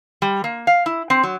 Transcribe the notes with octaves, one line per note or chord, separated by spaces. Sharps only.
G3
A#3
F5
E4
C4
F#3